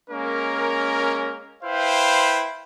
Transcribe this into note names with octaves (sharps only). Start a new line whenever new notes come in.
G#3 A#3 C#4 A#4
E4 B4 C5 F5 G5